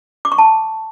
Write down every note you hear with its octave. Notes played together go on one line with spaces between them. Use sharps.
D6
C#6
A5